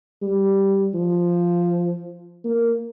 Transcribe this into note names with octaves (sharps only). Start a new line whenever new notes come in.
G3
F3
A#3